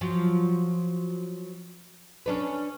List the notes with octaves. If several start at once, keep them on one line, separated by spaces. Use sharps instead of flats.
F3 F#3
C#4 D4 B4